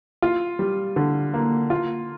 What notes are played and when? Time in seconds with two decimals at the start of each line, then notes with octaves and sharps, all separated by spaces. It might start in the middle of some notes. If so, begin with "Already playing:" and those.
0.22 F4
0.59 G3
0.96 D3
1.34 A#3
1.70 F4